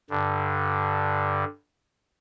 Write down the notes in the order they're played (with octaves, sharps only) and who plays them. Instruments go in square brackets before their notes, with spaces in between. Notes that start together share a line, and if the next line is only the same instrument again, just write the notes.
[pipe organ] G2 D3